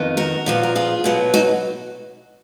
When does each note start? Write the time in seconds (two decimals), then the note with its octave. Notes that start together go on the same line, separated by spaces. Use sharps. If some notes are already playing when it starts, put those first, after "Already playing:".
Already playing: F2 D#3 B3
0.17 F#4 A#4
0.46 A#2 F3 B3
0.63 A#4
0.76 F4 G#4
1.04 B2 F#3 B3
1.34 D#4 F#4